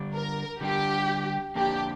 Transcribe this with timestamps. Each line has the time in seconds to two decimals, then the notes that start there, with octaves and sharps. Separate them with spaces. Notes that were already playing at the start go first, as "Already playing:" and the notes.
Already playing: D3 G3 D4
0.14 A#4
0.61 D3 G3 D4 G4
1.55 F2 D3 A#3 D4 G4